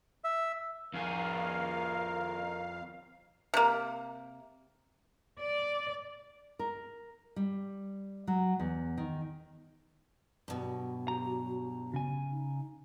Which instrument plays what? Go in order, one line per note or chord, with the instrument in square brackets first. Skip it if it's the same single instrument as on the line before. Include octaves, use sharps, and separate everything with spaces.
[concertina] E5
[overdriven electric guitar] F2 G#4 [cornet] A#4 [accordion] F5
[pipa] C3 A#3
[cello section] D5
[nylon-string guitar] A#4
G3
F#3
E2
D#3
[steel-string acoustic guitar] G2 B2 [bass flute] F#3
[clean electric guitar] G4 A#5
C#3 G#5
[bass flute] D#4